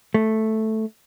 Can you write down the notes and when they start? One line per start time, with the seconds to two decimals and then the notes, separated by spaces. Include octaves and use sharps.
0.14 A3